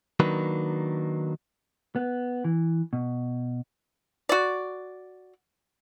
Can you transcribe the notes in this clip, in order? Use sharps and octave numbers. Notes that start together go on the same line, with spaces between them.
D#3 F#3 A#3 D4 B4
B3
E3
B2
F#4 D5